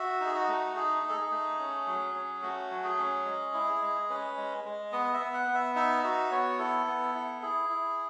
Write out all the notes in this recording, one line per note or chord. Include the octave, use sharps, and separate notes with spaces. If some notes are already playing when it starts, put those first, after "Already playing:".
Already playing: F#4 E5
D#4
G#4
F#4
A3
D#4 G#4
D#4
A4
G#4
A3
C#4
F#3
C#4
A3 F#4
F#3
G#4
C#4
G#3
E4
G#3
C#4 B4
G#3
G#3
B3 D#5
E5
B3
F#5
B3
E5
D#4 E5
F#4 E5
B3 C#5
E4 A4
B3
E4
E4 G#4
E4